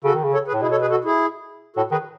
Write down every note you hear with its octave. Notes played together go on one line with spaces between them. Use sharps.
C#3 F#4 A4
D#3
C#3
A4 C#5
G#4 B4
A2
B2 E4 G#4
A4 C#5
G#4 B4
F#4 A4
E4 G#4
A2 F#4 A4
D#3 G#4 B4